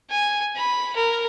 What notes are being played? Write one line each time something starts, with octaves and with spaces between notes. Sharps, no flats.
G#5
B5
A#4